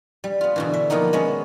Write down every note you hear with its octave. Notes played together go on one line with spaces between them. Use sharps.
G3
B3 F4
B2 D3 E3
E5
D#3 F3 A#3 B3 D#4
G#3 B3 C#4